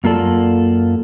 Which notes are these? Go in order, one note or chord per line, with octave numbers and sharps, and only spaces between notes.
F#2 A#3 F4 A4 D5